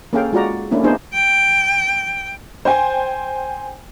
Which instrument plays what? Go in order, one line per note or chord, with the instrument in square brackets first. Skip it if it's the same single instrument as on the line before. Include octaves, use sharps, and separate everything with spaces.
[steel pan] A#3 C#4 G#4 A4 F5 G5
G#3 F4 F#4 D5 A#5
A3 A#3 C#4 D4 E4
A#3 B3 D4 D#4 G#4 C5
[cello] G5
[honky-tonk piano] C5 G5 G#5